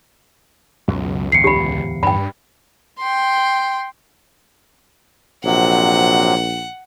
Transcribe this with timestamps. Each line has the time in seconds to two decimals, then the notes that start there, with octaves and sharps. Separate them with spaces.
0.88 C#2 F#2 B2 F#3
1.32 D1 E2 G#2 C7 C#7
1.44 G4 B5
2.03 G2 G5 B5
2.99 G5 C6
5.45 A#1 C3 F#3 F#5